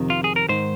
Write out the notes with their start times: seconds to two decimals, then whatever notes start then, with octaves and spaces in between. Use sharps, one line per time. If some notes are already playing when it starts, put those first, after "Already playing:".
Already playing: F2 C3 D#3
0.10 F4
0.24 G#4
0.36 A#4
0.49 G#2 D#3 C5